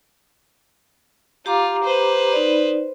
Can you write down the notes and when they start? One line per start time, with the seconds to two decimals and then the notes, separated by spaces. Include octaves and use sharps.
1.46 F4 G4 A#5 D6
1.84 B4 C5
2.33 D#4 D5